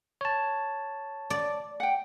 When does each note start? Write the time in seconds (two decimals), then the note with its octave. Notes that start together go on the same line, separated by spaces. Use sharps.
0.21 C#5 A5
1.30 D5
1.80 F#5 G5